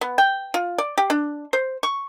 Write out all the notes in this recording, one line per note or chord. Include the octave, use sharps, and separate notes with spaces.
B3
G5
F4
D5
G4
D4
C5
C#6